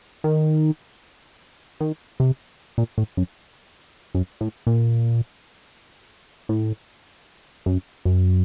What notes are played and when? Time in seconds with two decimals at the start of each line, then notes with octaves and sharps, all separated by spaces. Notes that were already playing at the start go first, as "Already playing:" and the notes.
0.24 D#3
1.80 D#3
2.20 C3
2.78 A#2
2.98 A2
3.17 F#2
4.15 F#2
4.41 A2
4.67 A#2
6.49 A2
7.66 F#2
8.05 F#2